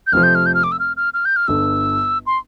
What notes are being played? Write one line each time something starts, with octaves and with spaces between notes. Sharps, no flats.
G6
F1 F2 C3 F3 F6
G6
F6
G6
F6
D6
E6
F6
F6
F6
G6
F6
G1 G2 D3 E6
C6